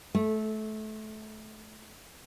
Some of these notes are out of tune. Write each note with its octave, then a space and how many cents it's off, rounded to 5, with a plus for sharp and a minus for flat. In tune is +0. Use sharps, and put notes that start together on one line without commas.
A3 -25